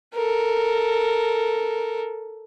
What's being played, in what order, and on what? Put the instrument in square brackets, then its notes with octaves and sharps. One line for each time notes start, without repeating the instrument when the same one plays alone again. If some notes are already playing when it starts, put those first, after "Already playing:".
[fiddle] A4 A#4